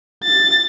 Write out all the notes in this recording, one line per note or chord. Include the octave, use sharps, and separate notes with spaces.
A6